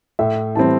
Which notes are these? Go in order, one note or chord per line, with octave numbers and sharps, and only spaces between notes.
A2 E5
E3 G3 C4 A5